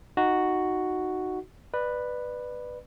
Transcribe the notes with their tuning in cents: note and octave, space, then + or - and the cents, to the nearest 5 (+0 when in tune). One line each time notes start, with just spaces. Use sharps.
D#4 +0 F#4 +0
B4 +0 D5 +25